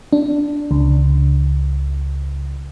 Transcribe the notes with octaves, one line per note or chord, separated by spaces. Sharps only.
D4
C#2